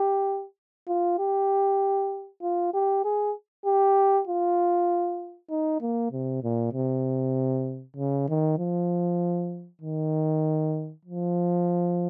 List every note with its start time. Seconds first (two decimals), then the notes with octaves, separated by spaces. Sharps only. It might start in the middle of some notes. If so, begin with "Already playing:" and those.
Already playing: G4
0.88 F4
1.19 G4
2.42 F4
2.74 G4
3.04 G#4
3.66 G4
4.27 F4
5.50 D#4
5.81 A#3
6.12 C3
6.43 A#2
6.73 C3
7.97 C#3
8.28 D#3
8.58 F3
9.81 D#3
11.05 F3